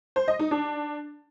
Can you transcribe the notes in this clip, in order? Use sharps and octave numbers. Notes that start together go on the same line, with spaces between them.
C5
D#5
D#4
D4